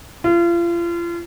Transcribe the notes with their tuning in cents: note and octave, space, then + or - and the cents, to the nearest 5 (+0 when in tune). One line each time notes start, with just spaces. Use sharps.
F4 -35